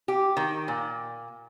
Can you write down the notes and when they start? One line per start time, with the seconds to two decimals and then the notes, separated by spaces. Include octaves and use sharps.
0.08 G4
0.37 D#3
0.68 A#2